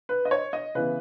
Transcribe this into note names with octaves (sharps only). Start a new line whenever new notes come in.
B4
D#5
C#5
D#5
C#3 E3 B3 B4